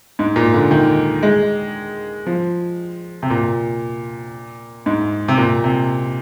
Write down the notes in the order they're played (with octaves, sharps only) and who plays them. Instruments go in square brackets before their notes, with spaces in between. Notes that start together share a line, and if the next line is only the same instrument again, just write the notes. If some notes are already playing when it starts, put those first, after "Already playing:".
[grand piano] G#2
A#2
D3
D#3
G#3
F3
C3
A#2
G#2
C3
A#2
C3